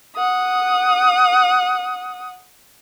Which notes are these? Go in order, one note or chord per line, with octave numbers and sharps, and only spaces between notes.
F#5 D#6